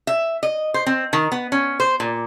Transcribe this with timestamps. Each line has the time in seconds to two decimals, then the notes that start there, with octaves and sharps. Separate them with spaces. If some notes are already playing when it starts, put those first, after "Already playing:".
0.07 E5
0.43 D#5
0.74 C5
0.86 C4
1.13 D#3
1.32 B3
1.52 C#4
1.80 C5
2.00 A#2